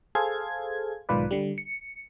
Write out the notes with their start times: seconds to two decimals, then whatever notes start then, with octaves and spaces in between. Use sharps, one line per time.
0.15 G#4 A4 C5 F5 G#6
1.09 B1 G#2 D#3 F4 B4 D5
1.31 D3 G3
1.58 C#7